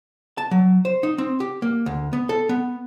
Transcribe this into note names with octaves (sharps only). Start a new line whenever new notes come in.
A5
F#3
C5
D#4
C4
G4
A#3
D2
B3
A4
B3